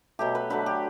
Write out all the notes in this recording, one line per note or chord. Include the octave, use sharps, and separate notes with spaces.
B2 F#3 A3 G4
B4
D3 F#3 A3 B4
G4